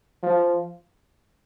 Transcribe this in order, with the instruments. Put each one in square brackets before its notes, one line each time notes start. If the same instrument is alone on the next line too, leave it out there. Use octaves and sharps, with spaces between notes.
[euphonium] F3